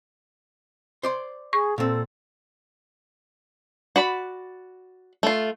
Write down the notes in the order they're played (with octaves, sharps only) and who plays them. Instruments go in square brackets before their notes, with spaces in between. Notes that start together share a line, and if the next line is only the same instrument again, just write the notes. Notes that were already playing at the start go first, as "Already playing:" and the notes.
[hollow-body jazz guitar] C5 D5 C6
[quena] G#4 [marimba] C#6
[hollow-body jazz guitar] A#2 C4 [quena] A4
[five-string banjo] F#4 D5 B5
A3 F4